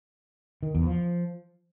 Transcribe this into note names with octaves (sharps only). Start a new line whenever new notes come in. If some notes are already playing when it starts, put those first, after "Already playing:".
D#3
E2
F3